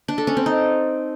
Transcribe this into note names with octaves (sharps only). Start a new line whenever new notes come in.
D4
A4
C#4
C4
D#4